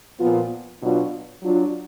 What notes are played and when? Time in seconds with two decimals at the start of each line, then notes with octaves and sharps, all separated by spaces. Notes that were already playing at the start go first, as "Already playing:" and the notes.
0.19 A#2 F3 B3 F4
0.81 B2 F#3 D4 F4
1.42 F#3 D4 F4